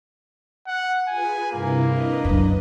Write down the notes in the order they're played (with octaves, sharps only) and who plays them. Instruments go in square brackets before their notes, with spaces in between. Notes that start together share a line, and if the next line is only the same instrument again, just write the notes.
[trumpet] F#5
[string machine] F4 G#4 B4 [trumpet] G#5
[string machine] G2 C3 E4 [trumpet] A#3
[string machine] D4 B4 D#5
[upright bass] F#2 C#3